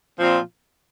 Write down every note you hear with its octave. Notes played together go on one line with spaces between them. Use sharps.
A#2 F3 C4 F4